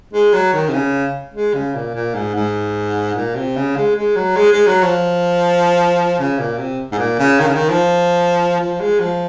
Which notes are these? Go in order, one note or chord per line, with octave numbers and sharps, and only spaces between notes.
G#3
F#3
D#3
C3
C#3
G#3
C#3
A#2
A#2
G#2
G#2
A#2
C3
C#3
G#3
G#3
F#3
G#3
G#3
F#3
F3
C#3
A#2
C3
G#2
A#2
C#3
D#3
C#3
D#3
F3
F3
G#3
F3